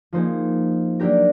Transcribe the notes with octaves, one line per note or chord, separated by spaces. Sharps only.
F3 A#3 D#4 G#4 C5
F#3 A#3 D4 G4 A#4